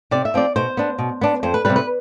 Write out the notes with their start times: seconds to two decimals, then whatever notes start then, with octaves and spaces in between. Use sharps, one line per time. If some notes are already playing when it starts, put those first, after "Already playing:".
0.11 C3 D5
0.25 E5
0.34 F3 C4 D5
0.56 B2 C5
0.77 B3 D4
0.98 B2
1.21 B3 D4
1.43 F2 C5
1.54 B4
1.65 C3 G3 B4
1.76 B4